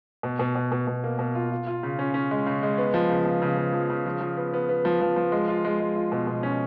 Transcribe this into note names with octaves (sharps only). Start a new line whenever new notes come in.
B2
B2
B2
B2
B2
A#3
B2
F4
F4
F4
C#3
C#4
C#4
G#3
C#3
G#3
B3
F3
C#3
F3
C#3
F3
F3
C#3
F3
F3
B3
B3
B3
F3
F3
F3
G#3
F4
G#3
G#3
F4
B2
B2
C#4